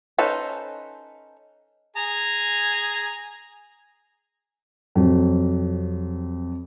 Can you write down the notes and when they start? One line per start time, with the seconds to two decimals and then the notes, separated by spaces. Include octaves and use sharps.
0.18 C#4 D#4 A4 B4 C5
1.96 G#4 G#5 A#5
4.95 F2 C3 F#3